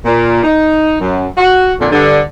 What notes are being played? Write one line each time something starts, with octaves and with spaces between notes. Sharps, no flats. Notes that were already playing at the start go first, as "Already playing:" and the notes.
A#2
D#4
F#2
F#4
F2 A#2 D3
G2 D3